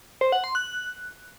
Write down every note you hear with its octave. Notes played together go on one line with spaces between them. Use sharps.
C5
F#5
C6
F#6